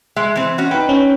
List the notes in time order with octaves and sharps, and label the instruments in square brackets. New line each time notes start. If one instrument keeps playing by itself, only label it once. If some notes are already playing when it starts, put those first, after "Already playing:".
[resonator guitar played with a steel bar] G#3 [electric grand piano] E5
[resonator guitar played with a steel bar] E3 C4
C#4 F#4
[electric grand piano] D#4 G5 [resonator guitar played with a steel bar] B4
[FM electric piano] C#4